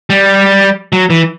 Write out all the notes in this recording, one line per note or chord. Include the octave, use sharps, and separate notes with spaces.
G3
F#3
E3